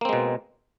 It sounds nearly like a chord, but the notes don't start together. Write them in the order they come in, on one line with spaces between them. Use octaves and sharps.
A#3 C4 G#3 B2